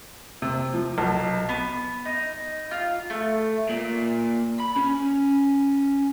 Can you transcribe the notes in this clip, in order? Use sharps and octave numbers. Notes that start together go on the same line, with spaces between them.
C3
F3
B1
B3
D#4
F4
A3
A#2
B5
C#4